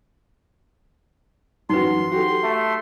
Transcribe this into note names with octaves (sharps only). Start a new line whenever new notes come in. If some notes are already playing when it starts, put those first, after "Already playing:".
F#2 E3 D#4 F#4 B4 C6
F#4 G4 A4
A3